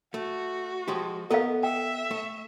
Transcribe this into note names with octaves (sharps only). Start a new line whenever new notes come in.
A3 F#4
F3 G#3 G4
B3 A4 A#4 D#5 F5
E5 G5
A3